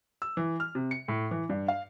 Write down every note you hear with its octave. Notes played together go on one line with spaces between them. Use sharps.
E6
E3
F6
C3
C#7
A2
E3
G2
F5